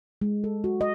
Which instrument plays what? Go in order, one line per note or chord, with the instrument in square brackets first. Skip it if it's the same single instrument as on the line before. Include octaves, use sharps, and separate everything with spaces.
[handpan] G#3
A4
F#4
D#5